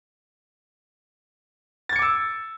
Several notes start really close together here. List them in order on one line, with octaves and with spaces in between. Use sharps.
A6 G#6 C#7 D6 E6